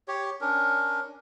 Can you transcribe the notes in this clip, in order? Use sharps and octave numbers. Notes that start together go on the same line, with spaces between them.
G4 C#5
C#4 D4 A#4